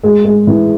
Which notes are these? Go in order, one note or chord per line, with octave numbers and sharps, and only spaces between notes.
G#3
G#3
E3